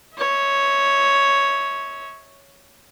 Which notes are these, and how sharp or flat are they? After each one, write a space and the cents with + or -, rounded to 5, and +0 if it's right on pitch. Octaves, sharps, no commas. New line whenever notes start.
C#5 +0 E5 -35